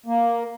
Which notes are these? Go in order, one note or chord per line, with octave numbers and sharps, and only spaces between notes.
A#3